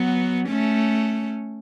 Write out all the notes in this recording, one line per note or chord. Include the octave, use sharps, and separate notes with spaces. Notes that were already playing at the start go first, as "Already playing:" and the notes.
Already playing: F#3 B3
A3 C#4